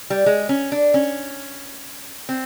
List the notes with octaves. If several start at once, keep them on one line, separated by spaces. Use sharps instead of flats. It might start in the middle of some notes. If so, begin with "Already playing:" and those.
G3
G#3
C#4
D4
C#4
C4